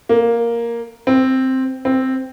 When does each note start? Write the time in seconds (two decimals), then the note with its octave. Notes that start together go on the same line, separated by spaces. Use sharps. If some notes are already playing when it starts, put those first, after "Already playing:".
0.09 A#3
1.07 C4
1.85 C4